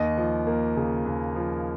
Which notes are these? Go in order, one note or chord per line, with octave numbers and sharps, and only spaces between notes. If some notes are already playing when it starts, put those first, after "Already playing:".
Already playing: D#2 D#5
F3
A#3
C#3
D#2
F3